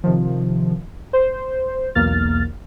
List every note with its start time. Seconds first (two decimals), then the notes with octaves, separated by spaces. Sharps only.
0.04 C3 D#3 F3
1.13 C5
1.95 B1 E2 A#3 F6 A6